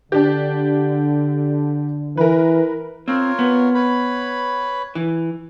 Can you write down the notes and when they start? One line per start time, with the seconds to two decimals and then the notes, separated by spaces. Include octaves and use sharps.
0.12 D3 D4 G4
2.17 E3 A#4 B4
3.08 C4 F4 A#4 C#5
3.39 B3
3.75 B4 C#5 B5
4.95 E3